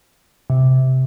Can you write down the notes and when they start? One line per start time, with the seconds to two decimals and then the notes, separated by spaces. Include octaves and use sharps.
0.50 C3